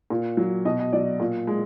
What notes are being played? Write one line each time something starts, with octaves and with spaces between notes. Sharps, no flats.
A#2
F#3
B2 D#5
D#5
F#3 D5
A#2
G#3